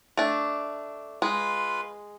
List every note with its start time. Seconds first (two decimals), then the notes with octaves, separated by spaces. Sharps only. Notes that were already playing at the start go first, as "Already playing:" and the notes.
0.17 A3 D4
1.22 G#3 F4 B4